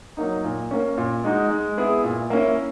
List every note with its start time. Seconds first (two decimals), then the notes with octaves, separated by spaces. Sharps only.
0.17 F#3 A#3 D#4
0.44 A#2
0.71 A#3 C#4
0.97 A#2
1.24 G#3 D#4 F#4
1.50 G#3
1.77 B3 E4 G#4
2.04 A#2
2.30 A#3 C#4 E4